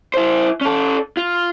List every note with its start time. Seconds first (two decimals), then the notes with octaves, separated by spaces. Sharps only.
0.14 E4 C5
0.61 C#4 A4
1.17 F4